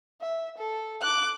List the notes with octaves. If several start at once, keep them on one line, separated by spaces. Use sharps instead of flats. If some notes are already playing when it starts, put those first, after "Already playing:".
E5
A4
D6 F#6